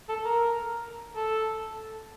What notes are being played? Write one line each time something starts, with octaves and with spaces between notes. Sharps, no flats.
A4
A#4
A4